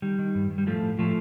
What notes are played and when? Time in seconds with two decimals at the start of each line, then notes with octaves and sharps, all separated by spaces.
0.02 D#3 G3
0.19 D#3
0.35 G2
0.50 G2
0.58 G3
0.66 A2 F3 A3
0.82 A2
0.98 A2 F3 A3